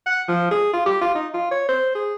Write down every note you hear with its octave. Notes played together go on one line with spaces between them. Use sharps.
F#5
F3
G#4
F4
G4
F4
D#4
F4
C#5
C5
G#4